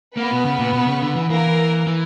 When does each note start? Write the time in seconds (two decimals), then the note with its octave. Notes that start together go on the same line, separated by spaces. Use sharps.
0.16 A#3 B3 B4
0.31 B2
0.45 C#3
0.59 A#2
0.73 B2
0.88 C#3
1.02 D3
1.16 E3
1.30 E3 A#3 A#4
1.87 E3